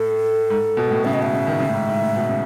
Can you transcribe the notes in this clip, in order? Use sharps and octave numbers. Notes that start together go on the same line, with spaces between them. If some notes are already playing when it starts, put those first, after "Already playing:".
Already playing: A2 A4
G#2
B2
A2
C#3 E5
D#5
B2
E5
C#3
D#3
C#3
A2
G#2
G#2
A2
B2
C#3